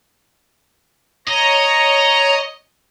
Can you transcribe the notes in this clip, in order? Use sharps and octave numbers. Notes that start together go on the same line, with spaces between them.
C#5 D#5 A#5